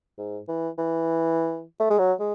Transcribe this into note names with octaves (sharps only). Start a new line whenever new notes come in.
G#2
E3
E3
A3
G#3
F#3
G#3